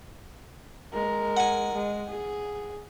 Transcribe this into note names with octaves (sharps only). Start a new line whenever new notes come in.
G#3 A#4
F#5 G#5
G#3
G#4